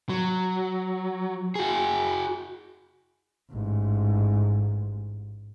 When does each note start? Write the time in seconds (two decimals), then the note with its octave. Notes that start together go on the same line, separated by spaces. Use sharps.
0.09 F#3
1.55 F#4 G#4
3.51 A1 G#2